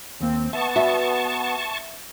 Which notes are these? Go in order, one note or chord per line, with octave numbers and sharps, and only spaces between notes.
D#2 A#3 C4
B3 E5 A5 C#6
F#4 B4 D5 E5